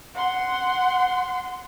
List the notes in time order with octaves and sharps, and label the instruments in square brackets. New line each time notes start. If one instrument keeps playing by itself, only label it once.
[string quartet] F#5 C6